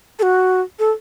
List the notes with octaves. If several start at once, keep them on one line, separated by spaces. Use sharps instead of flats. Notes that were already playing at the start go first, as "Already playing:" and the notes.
A4
F#4
A4